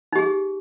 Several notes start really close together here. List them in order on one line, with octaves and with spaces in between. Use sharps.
D#4 G4 G#4